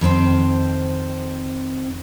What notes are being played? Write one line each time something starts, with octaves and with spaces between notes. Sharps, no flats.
F2 D#3 C4 C5